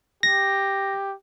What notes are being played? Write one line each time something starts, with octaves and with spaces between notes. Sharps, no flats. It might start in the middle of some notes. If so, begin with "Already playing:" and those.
G4 A#6